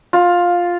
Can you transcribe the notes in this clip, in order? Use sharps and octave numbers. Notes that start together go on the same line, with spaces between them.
F4